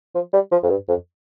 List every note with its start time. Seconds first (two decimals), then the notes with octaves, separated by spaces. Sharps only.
0.14 F3
0.33 G3
0.52 F3
0.63 F2
0.70 G2
0.88 F2